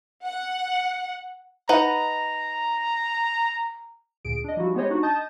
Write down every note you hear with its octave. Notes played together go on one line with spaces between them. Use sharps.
F#5
D#4 B4 F#5 A#5
D2 A#2 G#4 D7
D4 D#5
F3 G3 D#4 E4 F#4
G#3 B3 G4 C5 C#5 D#5
D4 D#4 F#4
D#5 A5 D#6 G6 A6